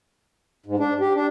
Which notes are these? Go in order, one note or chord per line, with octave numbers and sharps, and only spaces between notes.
G#2
D4
G4
D4